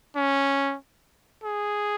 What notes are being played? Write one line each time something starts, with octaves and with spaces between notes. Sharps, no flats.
C#4
G#4